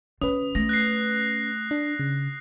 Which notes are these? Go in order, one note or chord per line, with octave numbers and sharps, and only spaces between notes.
D3 C#4 B4 D#6
A3 A#6
F#6 A#6 C7
D4
C#3